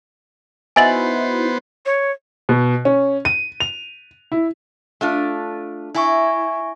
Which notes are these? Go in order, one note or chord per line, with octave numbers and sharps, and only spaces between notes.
B3 D#4 E4 F#4 C5 G#5 A6 F#7
C#5
B2
C#4
D#7
F7
E4
A3 D4 F4
E4 E5 G#5 C#6